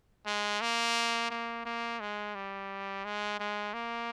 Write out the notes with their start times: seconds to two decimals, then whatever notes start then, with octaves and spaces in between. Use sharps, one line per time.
0.26 G#3
0.61 A#3
1.30 A#3
1.65 A#3
2.00 G#3
2.35 G3
3.05 G#3
3.39 G#3
3.74 A#3